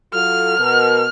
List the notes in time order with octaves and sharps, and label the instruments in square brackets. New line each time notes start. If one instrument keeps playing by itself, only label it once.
[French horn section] F#3 F4 A4 [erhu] F6
[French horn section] B2 A#4